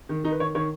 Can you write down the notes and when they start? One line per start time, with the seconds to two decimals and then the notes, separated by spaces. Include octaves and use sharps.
0.09 D#3
0.24 D#3 D#4
0.31 B4
0.40 D#3 C#5
0.55 D#3 C#5